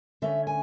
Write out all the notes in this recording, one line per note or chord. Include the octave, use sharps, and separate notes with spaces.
D3 A3 C#4 E5
G#5